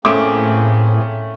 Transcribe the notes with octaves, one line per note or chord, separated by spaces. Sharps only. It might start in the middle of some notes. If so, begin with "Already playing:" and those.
A2 A3 A#3 C4 C#4 G#4 D6